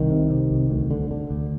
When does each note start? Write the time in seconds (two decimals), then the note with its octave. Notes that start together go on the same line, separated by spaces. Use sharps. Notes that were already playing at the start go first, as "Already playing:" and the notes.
Already playing: C2 D#3
0.11 C3
0.30 C3
0.51 C2
0.70 D2
0.91 D3
1.11 D3
1.31 D2